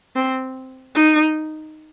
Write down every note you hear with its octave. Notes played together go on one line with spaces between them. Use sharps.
C4
D#4